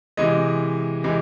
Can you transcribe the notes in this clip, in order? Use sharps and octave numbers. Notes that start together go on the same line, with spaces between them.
C3 E3 G#3 D#5
C3 E3 G#3